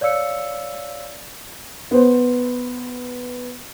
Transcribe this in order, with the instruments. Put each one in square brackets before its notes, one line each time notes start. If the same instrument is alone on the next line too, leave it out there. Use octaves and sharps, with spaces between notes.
[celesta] C#5 D5 F5 E6 C#7
[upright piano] B3 C5